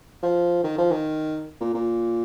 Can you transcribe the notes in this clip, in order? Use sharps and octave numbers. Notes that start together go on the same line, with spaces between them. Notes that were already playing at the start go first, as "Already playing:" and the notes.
F3
D#3
F3
D#3
A#2
A#2